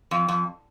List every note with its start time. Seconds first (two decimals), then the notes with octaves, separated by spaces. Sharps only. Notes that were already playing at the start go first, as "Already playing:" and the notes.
0.11 F2
0.28 F2